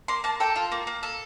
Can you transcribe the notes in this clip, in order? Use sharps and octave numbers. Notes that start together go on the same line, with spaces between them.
A#3 C6
A#3 A5
A4 G5
F4
A#3
A#3
A4